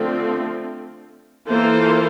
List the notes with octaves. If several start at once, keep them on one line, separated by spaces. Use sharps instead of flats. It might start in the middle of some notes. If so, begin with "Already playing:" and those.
Already playing: D3 F3 A3 C4
E3 A#3 F4 A4 C5